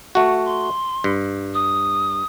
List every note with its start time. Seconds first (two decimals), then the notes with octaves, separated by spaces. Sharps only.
0.15 A3 F#4 F#5
0.45 C6
1.04 G2
1.54 D#6